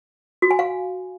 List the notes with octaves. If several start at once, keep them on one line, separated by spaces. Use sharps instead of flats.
F#4
G#5
F5